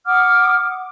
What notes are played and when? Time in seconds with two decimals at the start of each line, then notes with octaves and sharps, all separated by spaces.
0.06 F#5 D6 D#6 F6